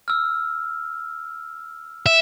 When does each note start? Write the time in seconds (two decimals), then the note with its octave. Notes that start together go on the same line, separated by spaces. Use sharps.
0.08 E6 F6
2.06 E5